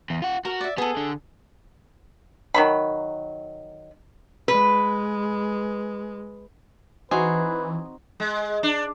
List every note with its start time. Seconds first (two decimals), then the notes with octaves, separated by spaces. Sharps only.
0.10 E2
0.22 F4 F#5
0.45 F#4 A#4
0.61 D5 E5
0.78 B3 G#4 A4
0.97 D3
2.54 D#3 F#3 B5
4.48 G#3 B4
7.11 E3 C4 D#4 F#4 G#4 B4
8.20 G#3
8.63 D4